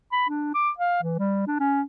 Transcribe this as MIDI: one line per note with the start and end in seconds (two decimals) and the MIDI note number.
0.12 0.27 83
0.29 0.54 62
0.55 0.70 86
0.78 1.01 77
1.03 1.18 52
1.19 1.45 55
1.47 1.59 62
1.60 1.82 61